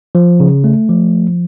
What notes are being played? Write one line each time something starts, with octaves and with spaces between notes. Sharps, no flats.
F3
C#3
A3
F3